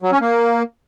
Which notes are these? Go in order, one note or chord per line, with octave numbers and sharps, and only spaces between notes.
F#3
C#4
A#3